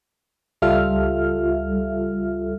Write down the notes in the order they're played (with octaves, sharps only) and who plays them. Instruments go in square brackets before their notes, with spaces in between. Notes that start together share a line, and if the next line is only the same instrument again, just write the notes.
[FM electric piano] C#2 G3 F4 A4 E5 F6